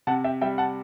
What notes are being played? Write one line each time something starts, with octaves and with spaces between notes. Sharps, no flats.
C3 F#5 A5
E5 G5
G3 E5 G5
F#5 A5